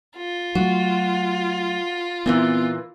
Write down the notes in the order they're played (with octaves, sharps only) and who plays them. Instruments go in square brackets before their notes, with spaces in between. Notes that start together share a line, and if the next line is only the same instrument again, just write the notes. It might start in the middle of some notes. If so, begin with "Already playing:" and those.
[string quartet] F4
[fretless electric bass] F#3 A3 [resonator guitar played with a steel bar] F#4
[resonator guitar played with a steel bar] A#2 D#3 E3 [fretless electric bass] B3 C4